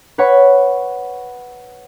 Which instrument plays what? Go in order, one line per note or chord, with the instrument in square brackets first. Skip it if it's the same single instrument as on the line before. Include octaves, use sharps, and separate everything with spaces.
[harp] B4 C#5 F#5 B5